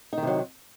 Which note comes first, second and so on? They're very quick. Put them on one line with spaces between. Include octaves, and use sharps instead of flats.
D#4 D#3 C3 F#3